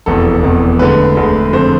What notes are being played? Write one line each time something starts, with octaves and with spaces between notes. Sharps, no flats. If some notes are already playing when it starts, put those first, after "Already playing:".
F1 E2 B2 A4
F1 E2 B2
D2 D3 G#3 B4
D2 D3 G#3
F2 D3 A3 C4 C5